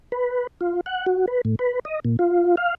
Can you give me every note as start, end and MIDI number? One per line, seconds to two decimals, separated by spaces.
0.12 0.47 71
0.61 0.81 65
0.86 1.06 78
1.06 1.26 66
1.28 1.41 71
1.45 1.55 45
1.59 1.79 71
1.85 2.00 75
2.05 2.16 46
2.19 2.55 65
2.57 2.75 77